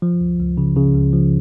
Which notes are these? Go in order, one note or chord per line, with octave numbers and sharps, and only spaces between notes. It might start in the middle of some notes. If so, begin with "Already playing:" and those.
F3
C#2
C#2
C#3
C#3
C#2
F3